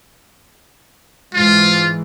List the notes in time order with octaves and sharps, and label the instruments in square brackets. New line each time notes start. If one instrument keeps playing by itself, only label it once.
[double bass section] G#2 E3 [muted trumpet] F4